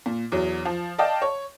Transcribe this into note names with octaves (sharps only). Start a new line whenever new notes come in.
A#2
E2 F#3
F3
D5 D#5 F5 G5 A5
C#5